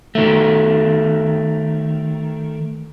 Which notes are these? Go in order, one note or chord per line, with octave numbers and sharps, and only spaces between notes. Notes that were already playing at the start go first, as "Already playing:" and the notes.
D#3 A3